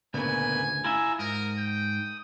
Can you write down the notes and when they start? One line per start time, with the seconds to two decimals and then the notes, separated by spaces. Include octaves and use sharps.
0.14 D2 A#2 C#3 B3 G#5
0.85 E4 F4 E5 G#5 A#5 E6
1.19 G#2 A#4 D#6
1.57 G5